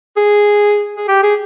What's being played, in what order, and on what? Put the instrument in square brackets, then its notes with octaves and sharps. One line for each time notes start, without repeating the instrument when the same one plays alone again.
[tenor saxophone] G#4
G#4
G4
G#4